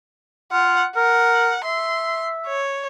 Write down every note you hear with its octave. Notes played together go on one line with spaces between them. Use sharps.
F4 F#5
A#4 F#5
E5 C6
C#5